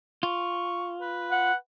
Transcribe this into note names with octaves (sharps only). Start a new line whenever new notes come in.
F4 C#6
B4
F#5